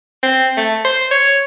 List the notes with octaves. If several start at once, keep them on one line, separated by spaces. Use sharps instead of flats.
C4
A3
C5
C#5